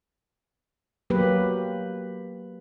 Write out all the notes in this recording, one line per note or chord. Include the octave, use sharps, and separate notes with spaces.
F#3 A#3 G4 B4